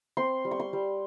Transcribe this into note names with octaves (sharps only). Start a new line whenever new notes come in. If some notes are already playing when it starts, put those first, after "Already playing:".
C4 C6
G3
C#6
C6
G3